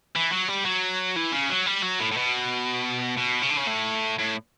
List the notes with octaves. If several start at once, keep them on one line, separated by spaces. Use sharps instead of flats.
E3
F#3
G3
F#3
E3
C#3
F#3
G3
F#3
A2
A2
B2
B2
C#3
D3
C#3
A2
A2